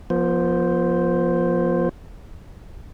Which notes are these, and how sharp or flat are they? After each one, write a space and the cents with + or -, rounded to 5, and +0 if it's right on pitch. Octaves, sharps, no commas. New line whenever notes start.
F3 +0 B3 -40 C5 +0